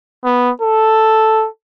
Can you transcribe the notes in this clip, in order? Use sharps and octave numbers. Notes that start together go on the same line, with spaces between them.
B3
A4